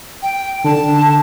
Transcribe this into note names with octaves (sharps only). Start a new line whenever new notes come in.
G5
D3 A5